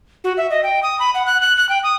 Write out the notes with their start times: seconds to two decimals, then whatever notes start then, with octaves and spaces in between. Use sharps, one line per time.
0.24 F#4
0.38 E5
0.50 D#5
0.63 G5
0.83 D#6
1.00 B5
1.14 F#5
1.26 F#6
1.41 F#6
1.57 F#6
1.69 G5
1.84 D#6